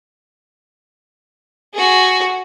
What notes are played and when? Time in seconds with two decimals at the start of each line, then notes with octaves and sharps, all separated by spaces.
1.74 F#4 G#4